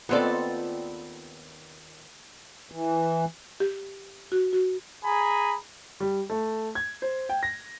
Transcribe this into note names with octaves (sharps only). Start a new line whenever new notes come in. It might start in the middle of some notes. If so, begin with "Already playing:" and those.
D#2 B3 C4 F4 A4 D5
E3
G4
F#4
F#4
G#4 G#5 A#5 B5
G3
A3
G#6
C5
G5
A#6